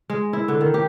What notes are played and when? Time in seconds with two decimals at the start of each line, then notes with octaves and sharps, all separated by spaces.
0.10 G#3
0.33 E4
0.48 D3
0.61 D#3
0.74 G4